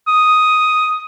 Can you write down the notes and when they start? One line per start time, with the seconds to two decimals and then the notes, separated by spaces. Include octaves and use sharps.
0.08 D#6